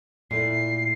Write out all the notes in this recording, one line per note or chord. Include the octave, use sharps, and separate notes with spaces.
A#2 A3 E4 C7